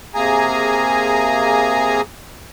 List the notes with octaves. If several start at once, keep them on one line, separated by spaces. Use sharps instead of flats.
C3 A#3 G#4 G#5 A#5